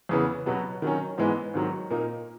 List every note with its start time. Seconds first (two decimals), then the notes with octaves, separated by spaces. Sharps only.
0.09 E2 C#3 E3 B3
0.46 B2 F#3 B3
0.82 D#3 F#3 C#4
1.18 G#2 E3 G#3 B3
1.54 G#2 D#3 F#3
1.90 A#2 A#3 D#4